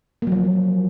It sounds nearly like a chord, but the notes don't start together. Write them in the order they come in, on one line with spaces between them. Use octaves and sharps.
A#3 F#3 F3